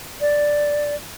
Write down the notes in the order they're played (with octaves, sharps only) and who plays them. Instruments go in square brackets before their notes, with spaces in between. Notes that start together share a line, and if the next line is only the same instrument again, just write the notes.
[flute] D5